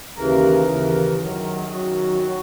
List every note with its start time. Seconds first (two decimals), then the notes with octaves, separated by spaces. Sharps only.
0.15 D#2 C#3 E3 A#4
0.66 D#2 C#3 E3
1.16 F#2 D#3 F#3 A#4
1.30 A#4
1.42 A#4
1.55 G#4
1.67 F#2 D#3 F#3 F#4
2.22 F#3